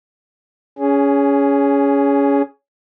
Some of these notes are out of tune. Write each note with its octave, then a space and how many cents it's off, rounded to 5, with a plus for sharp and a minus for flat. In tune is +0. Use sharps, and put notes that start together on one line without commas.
C#4 +20 G#4 +0